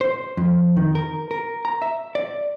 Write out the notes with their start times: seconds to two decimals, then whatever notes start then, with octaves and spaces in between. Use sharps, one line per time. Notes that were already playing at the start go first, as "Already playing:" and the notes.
0.01 C5
0.37 F2
0.76 D#3
0.95 A#4
1.31 A#4
1.65 A#5
1.82 E5
2.15 D5